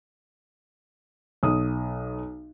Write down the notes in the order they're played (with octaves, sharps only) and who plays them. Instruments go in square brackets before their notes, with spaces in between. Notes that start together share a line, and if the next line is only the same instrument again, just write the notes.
[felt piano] B1 D#6